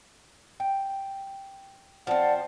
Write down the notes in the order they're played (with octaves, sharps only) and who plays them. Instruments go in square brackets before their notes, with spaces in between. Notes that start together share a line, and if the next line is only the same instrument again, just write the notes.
[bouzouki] G5
[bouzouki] F3 C4 [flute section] D5 F#5 A5